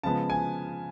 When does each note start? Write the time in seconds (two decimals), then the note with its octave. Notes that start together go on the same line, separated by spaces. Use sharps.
0.03 C#3 F3 G#3 B3 A5
0.30 G#5